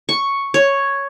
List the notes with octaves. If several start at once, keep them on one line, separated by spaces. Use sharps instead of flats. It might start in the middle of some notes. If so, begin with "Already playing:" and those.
C#6
C#5